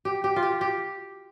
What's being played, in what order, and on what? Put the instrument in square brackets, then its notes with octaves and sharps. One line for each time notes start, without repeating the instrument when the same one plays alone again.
[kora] G4
G4
F4
G4
G4